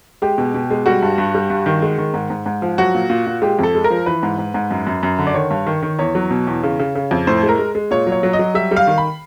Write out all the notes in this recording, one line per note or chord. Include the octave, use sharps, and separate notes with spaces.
G#3 G4
B2
B2
G#3
G3 F#4
G2
G2
G3
G2
D#3
G#3
D#3
G#2
G#2
G#2
F3
F#3 F#4
A#2
A#2
A#2
G#3 G4
F2 A4
G#3
A#4
F3
E3 B4
G#2
G#2
G#2
F#2
F#2
F#2
D3
D5
D#3 C#5
G2
D#3
D#3
E2 C#5
F#3
B2
E2
C#3
C#3
C#3
F2
A2 C5
G#3
A#4
G#3
G#3
A#2 C#5
F#3
C#5
F#3
D#5
F#3
G3 E5
G3
F5
D#3
B5